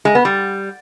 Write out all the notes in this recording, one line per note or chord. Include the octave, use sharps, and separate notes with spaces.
G#3
B3
G3